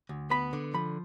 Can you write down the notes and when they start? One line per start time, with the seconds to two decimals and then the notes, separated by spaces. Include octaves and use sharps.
0.09 D2
0.30 B3 B5
0.53 D3
0.74 F3 B5